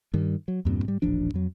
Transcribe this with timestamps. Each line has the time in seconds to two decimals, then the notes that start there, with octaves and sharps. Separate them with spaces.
0.14 G2 D#3 G3
0.48 F#3
0.65 E2 G2 A#2 C4
0.85 G#2 G3
1.02 D#1 A1 F3 D4
1.34 F2 F#3